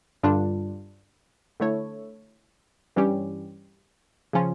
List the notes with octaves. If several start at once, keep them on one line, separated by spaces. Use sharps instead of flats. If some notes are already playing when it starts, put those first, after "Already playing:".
G2 D3 G3 D4 F4
D3 A3 E4 A4 C#5
G2 E3 G3 C#4 G4
C#3 F3 C#4 F4